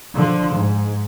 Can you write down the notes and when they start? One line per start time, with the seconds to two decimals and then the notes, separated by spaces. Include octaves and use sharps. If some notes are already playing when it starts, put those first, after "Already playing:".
0.15 D3 F3
0.55 G#2